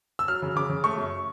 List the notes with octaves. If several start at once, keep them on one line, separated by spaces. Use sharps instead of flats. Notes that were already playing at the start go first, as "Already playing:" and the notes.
E6
F#3 F6
C#3
C#3 D6
C#3
A3 C#6
F#2